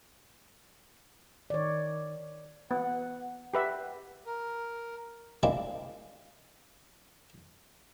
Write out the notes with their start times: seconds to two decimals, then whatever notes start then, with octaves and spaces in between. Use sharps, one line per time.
1.50 D#3 C#5 D5
2.71 B3 F#5
3.54 G4 B4 E5 F#5
4.26 A#4
5.43 G#3 A#3 C4 D4 E4